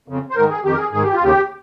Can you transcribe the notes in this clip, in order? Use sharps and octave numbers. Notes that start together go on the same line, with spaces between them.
F2 C#3
C5
G#2 D#3 A#4
G#4
F2 D#3 G4
A#4
G#4
G#2 D#3 G#4
G4
F4
D#2 C#3 G4